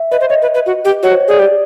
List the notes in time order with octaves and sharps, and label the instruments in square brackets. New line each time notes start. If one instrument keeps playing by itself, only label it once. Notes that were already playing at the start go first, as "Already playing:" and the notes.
Already playing: [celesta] E5
[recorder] B4 [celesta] D#5
[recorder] C5
[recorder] C#5 [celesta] D#5
[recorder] B4
B4
F#4
G4
[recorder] F#4 [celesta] C#5
[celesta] C5
C#5
[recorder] G#4 [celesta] D5
[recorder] G4 [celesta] D5